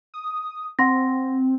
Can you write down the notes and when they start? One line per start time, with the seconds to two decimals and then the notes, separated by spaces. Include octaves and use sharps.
0.14 D#6
0.79 C4 F#5 C6 A#6